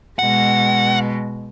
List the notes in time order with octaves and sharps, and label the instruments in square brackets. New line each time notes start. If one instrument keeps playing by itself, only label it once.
[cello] B2 G#3 [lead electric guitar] F#5